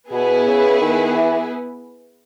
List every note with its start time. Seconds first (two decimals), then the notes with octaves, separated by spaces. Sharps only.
0.11 B2 B3 E4 G#4 B4
0.46 C#3
0.81 D#3
1.15 E3